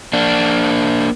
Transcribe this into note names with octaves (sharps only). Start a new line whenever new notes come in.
A#3 D4